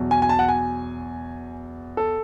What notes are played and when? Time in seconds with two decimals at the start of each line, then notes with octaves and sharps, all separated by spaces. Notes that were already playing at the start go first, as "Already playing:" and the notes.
Already playing: E2 B2 F#3
0.11 G#5
0.22 G#5
0.29 A5
0.39 F#5
0.48 G#5
1.97 A4